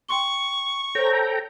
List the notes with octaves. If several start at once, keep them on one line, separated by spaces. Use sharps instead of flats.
G5 C6 C#6 G7
A4 C5 C#5 G5 A#5